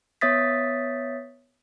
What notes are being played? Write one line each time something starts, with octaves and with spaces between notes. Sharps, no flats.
B3 C#5 E5 D#6 A6 B6